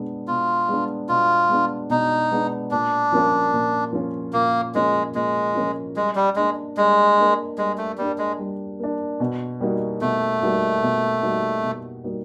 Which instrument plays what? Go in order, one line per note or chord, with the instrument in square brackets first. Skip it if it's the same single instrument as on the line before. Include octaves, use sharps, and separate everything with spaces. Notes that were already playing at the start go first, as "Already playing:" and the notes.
Already playing: [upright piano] B2 G#3 B3 D4
[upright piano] B2 [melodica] F4
[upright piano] G#3 B3 D4
[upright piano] B2 [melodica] F4
[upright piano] G#3 B3 D4
[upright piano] B2 [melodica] D#4
[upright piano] G#3 B3 D4
[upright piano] A#2 [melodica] D4
[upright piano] F3 A#3 C#4 F4
A#2
F3 A#3 C#4 F4
[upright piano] A#2 [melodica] A#3
[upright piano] F3 A#3 C#4 F4 [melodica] G#3
[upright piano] A#2 [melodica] G#3
[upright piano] F3 A#3 C#4 F4
[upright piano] G3 [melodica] G#3
[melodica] G3
[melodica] G#3 [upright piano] A#3 D4
[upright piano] G3 [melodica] G#3
[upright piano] A#3 D4
[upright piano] G3 [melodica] G#3
[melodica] A3
[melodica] G3 [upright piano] A#3 D4
[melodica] G#3
[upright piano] G3
A#3 D4
B2
G3 A#3 D#4 F#4
[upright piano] B2 [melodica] A3
[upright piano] G3 A#3 D#4 F#4
B2
G3 A#3 D#4 F#4
B2
G3 A#3 D#4 F#4